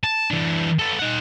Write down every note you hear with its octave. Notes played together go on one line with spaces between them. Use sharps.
A5
E3 D4
B3 A4
D#4 F#5